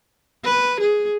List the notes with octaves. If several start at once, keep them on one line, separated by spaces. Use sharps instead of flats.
B4
G#4